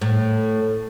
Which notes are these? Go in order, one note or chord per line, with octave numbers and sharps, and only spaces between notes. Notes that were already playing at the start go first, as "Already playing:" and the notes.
A2